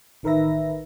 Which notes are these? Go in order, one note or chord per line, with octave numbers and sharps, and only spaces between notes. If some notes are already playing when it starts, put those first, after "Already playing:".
A1 D#3 A#4 B4 E5 A#6